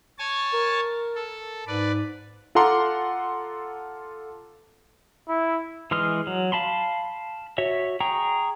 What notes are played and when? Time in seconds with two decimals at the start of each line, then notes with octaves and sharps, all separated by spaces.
0.19 C#5 G#5 A5
0.54 A#4
1.15 A4
1.67 G#2 B4 D5
2.55 F4 A4 F#5 A#5 C6 D6
5.29 E4
5.91 E3 G#3 C6 D#6 F6
6.27 F#3
6.52 F5 A5 B5 C6
7.58 F#4 C#5 E5
8.01 G#4 G5 A#5 C#6